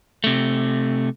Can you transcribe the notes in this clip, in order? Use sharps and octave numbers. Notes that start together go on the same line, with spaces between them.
C3 A3